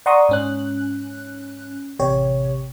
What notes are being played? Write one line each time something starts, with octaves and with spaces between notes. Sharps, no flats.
D5 F#5 A#5 C6 C#6 D#6
G#2 C#4 F#6
A1 C3 G4 C#5